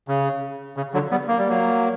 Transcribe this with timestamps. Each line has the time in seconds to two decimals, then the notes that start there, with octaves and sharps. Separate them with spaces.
0.08 C#3
0.77 C#3
0.94 D3 F#3
1.11 G3 B3
1.28 A#3
1.38 G3
1.49 F#3 A#3